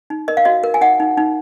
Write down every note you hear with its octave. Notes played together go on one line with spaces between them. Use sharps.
D#4
A#4 D#5
F5
F#4 D#5
A#4
G#5
D#4 D#5 F#5
D#4
D#4